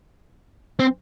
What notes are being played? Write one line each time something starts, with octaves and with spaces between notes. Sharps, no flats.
C4